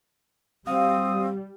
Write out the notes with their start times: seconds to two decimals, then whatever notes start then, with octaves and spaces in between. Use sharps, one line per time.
0.67 G3 C4 F4 F#4 F5 D#6